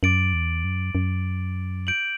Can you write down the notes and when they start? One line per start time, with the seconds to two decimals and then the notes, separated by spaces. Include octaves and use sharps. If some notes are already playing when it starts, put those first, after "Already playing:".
0.03 F#2 D6 A6 D7 F#7
0.33 E2
0.64 F#2
0.95 F#2
1.87 G6 D7 F#7